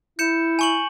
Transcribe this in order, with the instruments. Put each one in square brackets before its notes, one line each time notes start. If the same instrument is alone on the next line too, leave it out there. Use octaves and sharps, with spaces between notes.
[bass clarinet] E4 [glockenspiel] G6 C#7 E7
[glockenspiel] G#5 C#6 F#7